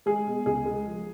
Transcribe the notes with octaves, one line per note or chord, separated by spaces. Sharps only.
G#3 G#4
B2
C#2 G#4
G#3
F3